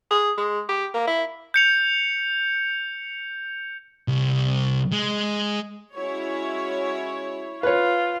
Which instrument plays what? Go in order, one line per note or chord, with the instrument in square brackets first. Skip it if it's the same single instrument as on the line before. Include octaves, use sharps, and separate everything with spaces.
[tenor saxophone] G#4
G#3
G4
A#3
E4
[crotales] G6 C#7 F7
[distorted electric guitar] C2
G#3
[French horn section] G#3 C#4 F#4 [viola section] E4 C#5
[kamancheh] F4 [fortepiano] B4 C#5